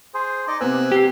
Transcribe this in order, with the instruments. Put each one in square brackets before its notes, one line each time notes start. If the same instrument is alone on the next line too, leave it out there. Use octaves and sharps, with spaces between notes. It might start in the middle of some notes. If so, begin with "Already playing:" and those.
[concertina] G#4 C5
D#4 D5 D#5
[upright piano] C3 B3 C4 [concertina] G#5 E6 F#6
[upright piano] C3 C7 [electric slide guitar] G4